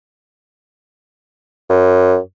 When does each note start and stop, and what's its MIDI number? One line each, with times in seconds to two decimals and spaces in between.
1.69 2.17 42